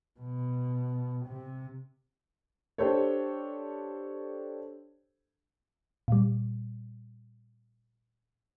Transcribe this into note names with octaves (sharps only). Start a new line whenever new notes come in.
B2
C3
D4 G4 A4 C5 C#5
A#2 G3